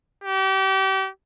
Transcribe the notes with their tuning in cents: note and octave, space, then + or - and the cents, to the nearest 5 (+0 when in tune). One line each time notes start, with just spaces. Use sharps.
G4 -35